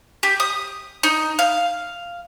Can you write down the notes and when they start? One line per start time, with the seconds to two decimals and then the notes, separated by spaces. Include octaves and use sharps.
0.23 G4
0.40 D#6
1.03 D#4
1.39 F5